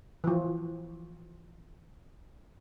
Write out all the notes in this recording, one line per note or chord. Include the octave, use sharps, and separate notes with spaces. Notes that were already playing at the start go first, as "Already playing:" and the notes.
E3 F3